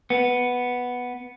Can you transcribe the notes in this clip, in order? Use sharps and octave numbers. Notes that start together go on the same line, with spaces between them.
B3